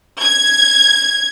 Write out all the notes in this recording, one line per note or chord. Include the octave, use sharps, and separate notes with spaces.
G#6